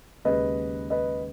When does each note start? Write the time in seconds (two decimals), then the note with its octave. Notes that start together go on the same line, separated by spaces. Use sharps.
0.25 D#2 C#3 G#3 B4 D#5
0.90 B4 D#5